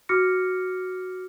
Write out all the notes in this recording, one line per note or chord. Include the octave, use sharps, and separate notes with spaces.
F#4 D6 F6 A#6 C#7